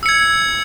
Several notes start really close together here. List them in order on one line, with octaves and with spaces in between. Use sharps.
E6 C#7 G#6